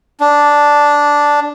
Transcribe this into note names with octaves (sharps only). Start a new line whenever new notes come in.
D4